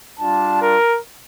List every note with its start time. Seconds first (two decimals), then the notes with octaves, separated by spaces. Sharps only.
0.18 G3 D4 F4 A5
0.61 A#4